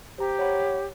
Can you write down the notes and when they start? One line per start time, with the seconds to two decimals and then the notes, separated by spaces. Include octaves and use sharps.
0.18 G4 C5 A#5
0.39 C#5 F#5 B5